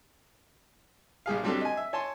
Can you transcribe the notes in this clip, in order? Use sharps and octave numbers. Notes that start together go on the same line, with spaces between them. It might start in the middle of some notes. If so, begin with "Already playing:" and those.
A#1 G3 G#4 F5
F#3 G3 C4 D4 G4 A4
D#5 G#5
E5
C#5 G#5 A5 C6